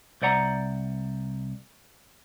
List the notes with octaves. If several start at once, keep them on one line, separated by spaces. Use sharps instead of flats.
C2 C5 D5 F#5 A#5